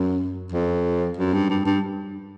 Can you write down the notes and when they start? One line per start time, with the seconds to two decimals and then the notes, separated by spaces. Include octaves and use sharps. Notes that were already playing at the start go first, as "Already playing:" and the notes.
Already playing: F#2
0.52 F2
1.17 F#2
1.33 G2
1.50 G2
1.66 G2